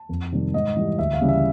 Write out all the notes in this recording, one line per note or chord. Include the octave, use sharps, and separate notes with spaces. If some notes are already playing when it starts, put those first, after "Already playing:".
Already playing: A5
F2
C3 D#3 G3
G#2 D#5
E3 G3
D2 E5
F5
C#3 E3 G3
E5